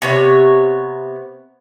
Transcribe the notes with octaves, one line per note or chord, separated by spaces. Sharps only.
C3 B3 C#5